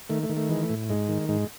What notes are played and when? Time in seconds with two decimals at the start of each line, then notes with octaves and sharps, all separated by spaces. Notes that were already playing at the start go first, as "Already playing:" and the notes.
0.10 D#3 A3
0.23 A3
0.30 D#3
0.37 A3
0.49 E3 G#3
0.63 A3
0.70 A2
0.90 G#2 G#3
1.08 D#3
1.29 G#2 G#3